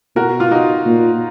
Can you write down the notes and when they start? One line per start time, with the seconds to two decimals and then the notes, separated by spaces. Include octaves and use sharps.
0.16 B2 F#4 A#4
0.40 F4
0.51 D#4 F#4
0.86 A#2